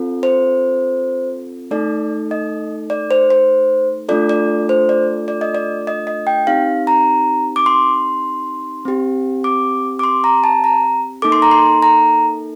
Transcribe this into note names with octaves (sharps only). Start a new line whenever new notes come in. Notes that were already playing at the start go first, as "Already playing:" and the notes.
Already playing: C4 F4 A4
C5
A3 D#4 A4 D5
D#5
D5
C5
C5
A3 D4 F4 A4 D5
D5
C5
D5
D5
D#5
D5
D#5
D#5
G5
C4 D#4 G4 F5
A#5
D6
C6
C4 G4
D6
D6
C6
A#5
A5
A#5
A#3 D#4 A4 D6
C6
A#5
C6
A#5